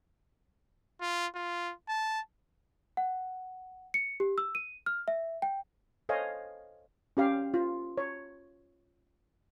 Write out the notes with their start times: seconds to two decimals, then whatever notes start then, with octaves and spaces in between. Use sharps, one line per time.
1.01 F4
1.35 F4
1.88 A5
2.97 F#5
3.94 C#7
4.20 G4
4.38 E6
4.55 D#7
4.86 F6
5.08 E5
5.42 G5
6.09 A4 C5 C#5 D#5 F5 G#5
7.17 C#4 G4 F5
7.54 F4
7.98 C#5